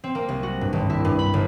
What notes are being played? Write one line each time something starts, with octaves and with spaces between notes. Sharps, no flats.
C4
A#3
C2
F#4
G2
G#1
E4
G2
B5
G1